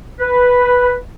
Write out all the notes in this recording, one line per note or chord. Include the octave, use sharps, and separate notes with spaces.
B4